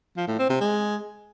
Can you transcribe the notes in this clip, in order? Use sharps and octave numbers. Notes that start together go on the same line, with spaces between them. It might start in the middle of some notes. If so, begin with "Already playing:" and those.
F3
A2
C4
C3
G#3